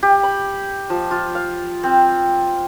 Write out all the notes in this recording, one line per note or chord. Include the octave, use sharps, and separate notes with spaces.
G4
B5
F3
F4
F5
C4